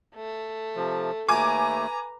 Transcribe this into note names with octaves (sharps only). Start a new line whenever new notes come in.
A3
C3 F3
D#2 A3 B4 G#5 A#5 D6